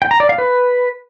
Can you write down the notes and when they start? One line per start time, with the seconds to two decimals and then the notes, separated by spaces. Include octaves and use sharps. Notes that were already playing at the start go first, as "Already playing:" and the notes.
0.02 G5
0.11 A#5
0.20 D5
0.29 F5
0.38 B4